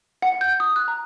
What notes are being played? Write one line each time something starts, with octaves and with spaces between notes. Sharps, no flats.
F#5
G6
D#6
F#6
A#5